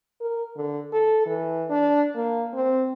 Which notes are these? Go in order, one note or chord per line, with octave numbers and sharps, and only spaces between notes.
A#4
D3
A4
E3
D4
A#3
C4